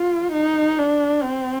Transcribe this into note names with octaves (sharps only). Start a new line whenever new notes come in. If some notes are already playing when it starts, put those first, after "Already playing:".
Already playing: F4
D#4
D4
C4